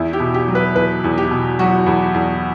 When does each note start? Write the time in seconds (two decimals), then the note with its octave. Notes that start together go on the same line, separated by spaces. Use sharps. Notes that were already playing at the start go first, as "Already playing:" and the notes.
Already playing: E2 E4
0.13 G4
0.20 B2
0.34 G4
0.48 F#3
0.55 B4
0.76 E2 B4
1.04 E2
1.18 G4
1.31 B2
1.59 F#3 F#4
1.86 E2
2.14 E2